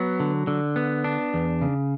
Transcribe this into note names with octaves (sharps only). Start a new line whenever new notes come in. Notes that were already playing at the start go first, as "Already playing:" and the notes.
Already playing: F#3 B3
D3
D3
B3
D4
E2
C#3